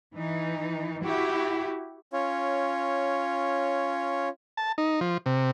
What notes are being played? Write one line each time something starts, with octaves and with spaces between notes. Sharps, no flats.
E3 D#4
E4 F#4 G4
C#4 F4 C#5
A5
D#4
F3
C3